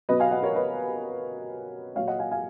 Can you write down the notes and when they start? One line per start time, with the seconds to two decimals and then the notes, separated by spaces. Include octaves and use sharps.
0.09 B2 F#3 B4 D#5
0.20 F5 G#5
0.31 D#5 F#5
0.43 A#4 C#5
0.55 B4 D#5
1.95 A#2 F#3 C#5 F5
2.07 D#5 F#5
2.19 F5 G#5
2.31 F5 G#5